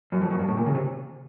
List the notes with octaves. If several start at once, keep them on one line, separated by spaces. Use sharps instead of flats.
F#2
F2
F#2
G2
A2
A#2
C#3
C3